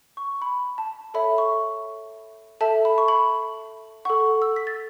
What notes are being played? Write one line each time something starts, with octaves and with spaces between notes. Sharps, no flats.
C#6
B5
A5
A4 C#5 E5 B5
C#6
A4 E5 A5
B5
C#6
B5
A4 F#5 C#6
E6
B6
A6